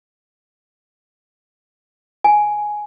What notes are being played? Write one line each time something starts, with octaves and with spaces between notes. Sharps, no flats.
G#5